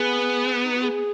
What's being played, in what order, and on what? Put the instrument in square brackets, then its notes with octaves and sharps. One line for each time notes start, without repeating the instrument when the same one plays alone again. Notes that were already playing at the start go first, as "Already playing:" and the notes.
Already playing: [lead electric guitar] B3 [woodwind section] G#4
[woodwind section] D#4
F#4
G#4